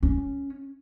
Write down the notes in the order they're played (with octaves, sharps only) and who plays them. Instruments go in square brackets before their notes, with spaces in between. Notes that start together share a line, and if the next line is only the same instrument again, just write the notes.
[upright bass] C#4